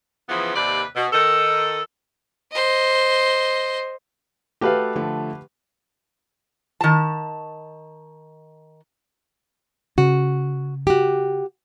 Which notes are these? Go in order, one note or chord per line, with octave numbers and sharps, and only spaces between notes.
C#3 E3 F3 B3
D#2 C3 B4 D5
B2
D#3 A4
C5 D#5
A3 F#4 G4 A4 B4 F5
D3 F3 A3
D#3 A5
C#3 F#4
F#4 G4